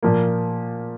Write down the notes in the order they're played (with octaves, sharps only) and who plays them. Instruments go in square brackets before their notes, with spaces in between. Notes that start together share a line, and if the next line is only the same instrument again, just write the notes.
[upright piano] A#2 F3 A#3